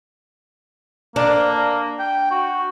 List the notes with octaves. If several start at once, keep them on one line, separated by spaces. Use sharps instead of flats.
A#3 D4
G5
F#4